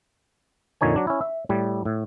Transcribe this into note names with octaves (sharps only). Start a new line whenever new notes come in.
F2 A#2 D3 D#4 C#5 G#5
F#3 D4
C#4 E4
E5
A2 G3
A2